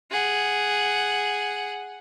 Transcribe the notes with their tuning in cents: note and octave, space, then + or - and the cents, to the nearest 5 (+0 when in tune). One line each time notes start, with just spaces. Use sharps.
G#4 +0 F#5 +0